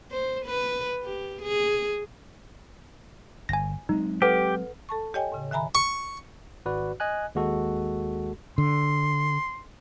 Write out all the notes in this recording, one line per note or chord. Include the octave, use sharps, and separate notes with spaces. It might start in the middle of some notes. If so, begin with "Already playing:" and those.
C5
B4
G4
G#4
G1 G#5 A#6
F#3 G#3 C4 D#4
G4 A4 B4 F#5 D6
A4 A5 C#6
G4 C#5 D#5 G5 G#5
A2 C#3
D#3 E5 G#5 A#5 B5
C#6
G#1 F#4 B4 D5
D#5 G#5 F#6
D#2 G#3 F#4 A4
D3 C6